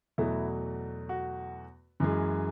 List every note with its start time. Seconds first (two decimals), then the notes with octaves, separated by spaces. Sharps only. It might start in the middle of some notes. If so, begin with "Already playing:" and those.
0.18 E2 B2 F#3 A3 E4
1.09 F#4
2.00 F#2 E3 G#3